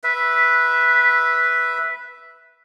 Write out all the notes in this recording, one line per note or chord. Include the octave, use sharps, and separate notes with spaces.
B4 E5